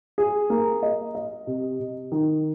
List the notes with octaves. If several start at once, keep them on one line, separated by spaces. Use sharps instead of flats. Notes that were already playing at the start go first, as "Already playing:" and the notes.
G#4
A#3
D#5
D#5
C3
C3
D#3